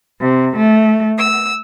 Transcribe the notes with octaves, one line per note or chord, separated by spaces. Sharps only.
C3
A3
E6